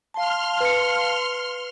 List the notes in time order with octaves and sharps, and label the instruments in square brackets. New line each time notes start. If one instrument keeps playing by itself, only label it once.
[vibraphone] F5 A5 [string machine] C6 F6
[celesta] B4 C#7